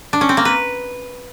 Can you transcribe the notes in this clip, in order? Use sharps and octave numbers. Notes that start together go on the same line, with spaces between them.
D4
C#4
C4
A#3
B4